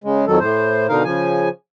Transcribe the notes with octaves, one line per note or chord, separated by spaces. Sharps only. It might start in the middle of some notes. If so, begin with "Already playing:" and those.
C#3 G#3
F2 D#3 F#3 A4
A2 C5
B2 D3 D#4 A#4 F5
C#3 F3 G#5